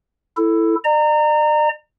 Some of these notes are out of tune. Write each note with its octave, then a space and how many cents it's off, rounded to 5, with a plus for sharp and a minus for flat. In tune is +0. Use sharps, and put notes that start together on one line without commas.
E4 +5 A4 +5
D5 +40 A#5 -20